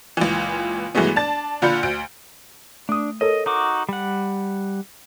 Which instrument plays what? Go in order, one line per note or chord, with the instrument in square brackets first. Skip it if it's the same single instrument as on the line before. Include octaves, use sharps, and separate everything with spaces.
[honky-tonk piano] C#2 A#2 E3
G2 E3 F#3 G#3 A3 B3
D4 A5 A6
A#2 D3 F4 B5 G6 C#7
D2 D7
[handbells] A3 D#6 [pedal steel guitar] D4
[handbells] A4 A#4 C#5 [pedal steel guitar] D#5
[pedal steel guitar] D#4 F#4 D6
G3 F#5